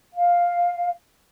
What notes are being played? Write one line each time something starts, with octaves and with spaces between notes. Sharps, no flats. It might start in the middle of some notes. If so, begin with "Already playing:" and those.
F5